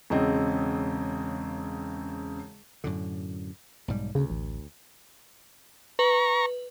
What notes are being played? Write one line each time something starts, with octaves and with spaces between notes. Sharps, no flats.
E1 C#3 C4 D#5
F#2 A2 D3
B1 G#2 G3
D2 C#3
A1
B4 A#5 C#6